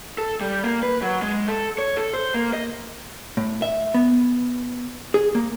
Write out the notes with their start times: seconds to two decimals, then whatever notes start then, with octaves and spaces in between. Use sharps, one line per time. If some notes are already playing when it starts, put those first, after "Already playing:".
0.18 A4
0.41 G3
0.64 A#3
0.83 B4
1.02 F#3
1.22 G#3
1.48 A4
1.78 C#5
1.97 A4
2.13 C5
2.34 A#3
2.53 D#5
3.37 A2
3.62 E5
3.94 B3
5.14 G#4
5.35 A#3